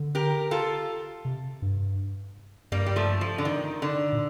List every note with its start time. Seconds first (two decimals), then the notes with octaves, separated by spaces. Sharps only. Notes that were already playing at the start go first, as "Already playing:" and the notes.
Already playing: D3
0.15 G4 A#4
0.51 F4 A4
1.25 C3
1.62 G2
2.72 G2 G3 A#3
2.86 G3
2.96 F3 A3
3.21 F3
3.38 D3
3.45 D#3
3.82 D3
4.13 A#2